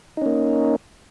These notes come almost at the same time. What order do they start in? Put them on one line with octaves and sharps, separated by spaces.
D#4 C#4 A#3